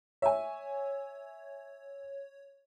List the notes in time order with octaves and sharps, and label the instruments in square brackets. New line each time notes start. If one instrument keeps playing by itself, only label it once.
[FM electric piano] C#5 [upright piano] E5 G#5